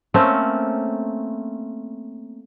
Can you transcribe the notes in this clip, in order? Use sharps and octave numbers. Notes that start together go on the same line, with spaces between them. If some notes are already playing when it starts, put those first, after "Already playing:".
A3 A#3 C4 C#4